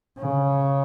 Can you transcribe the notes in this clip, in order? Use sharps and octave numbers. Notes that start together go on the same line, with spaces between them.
C#3